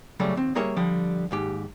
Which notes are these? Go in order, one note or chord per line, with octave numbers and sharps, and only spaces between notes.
C#3 F#3 G3 A3
D#2 C4
G3 A#3 G#4 A#4 C#5 E5
D3 F3 G3
D#2 G#2 G4